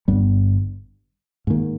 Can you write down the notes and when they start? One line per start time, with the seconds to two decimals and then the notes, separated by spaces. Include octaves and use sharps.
0.08 G1 G2 G3 B3
1.47 G#2 D#3 A#3